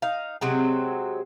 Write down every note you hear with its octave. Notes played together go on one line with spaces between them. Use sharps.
D#4 F5
C3 F#3 G#3 C4